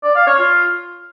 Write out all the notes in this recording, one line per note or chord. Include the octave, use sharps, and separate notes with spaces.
D5
F5
C#5
F4